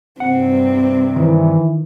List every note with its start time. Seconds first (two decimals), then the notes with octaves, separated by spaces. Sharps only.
0.20 G2 C3 C4 F#5
1.16 D#3 E3